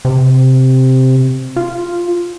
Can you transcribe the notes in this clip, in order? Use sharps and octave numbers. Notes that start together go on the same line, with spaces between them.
C3
F4